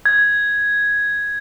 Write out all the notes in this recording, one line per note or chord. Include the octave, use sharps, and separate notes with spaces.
G#6